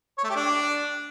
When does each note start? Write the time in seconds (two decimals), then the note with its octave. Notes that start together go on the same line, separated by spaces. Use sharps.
0.18 C#5
0.24 A3
0.30 G4
0.36 D4